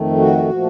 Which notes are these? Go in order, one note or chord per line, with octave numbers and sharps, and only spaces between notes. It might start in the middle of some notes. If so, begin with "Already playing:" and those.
Already playing: F2 D#3 A3
F#4
A#2 F3 A3